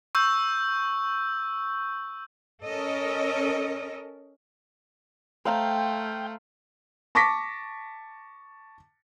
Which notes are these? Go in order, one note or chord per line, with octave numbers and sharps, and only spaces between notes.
C#6 E6 G6
C#4 A4 A#4 D#5
A3 C5 F5 G5 A#5
A5 C#6 D6 A#6 B6